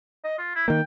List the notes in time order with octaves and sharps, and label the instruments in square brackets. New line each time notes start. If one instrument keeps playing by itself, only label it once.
[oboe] D#5
F4
E4
[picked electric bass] D#3 A#3 [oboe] G5